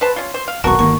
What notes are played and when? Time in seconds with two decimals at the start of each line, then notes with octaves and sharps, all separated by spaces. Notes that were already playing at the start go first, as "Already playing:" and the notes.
0.01 B4 C5 A5
0.16 C#4 F4
0.34 C5
0.48 F5
0.64 D#1 B1 B2 F#4 A#4 A5 C#6
0.79 G1 D#3 A#3 C#6